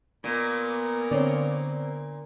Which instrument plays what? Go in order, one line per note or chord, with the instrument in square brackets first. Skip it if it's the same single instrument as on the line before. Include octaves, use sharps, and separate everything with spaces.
[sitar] A#2 [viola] A#3 B3
[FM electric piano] D3 [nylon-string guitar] C4 C#5 D5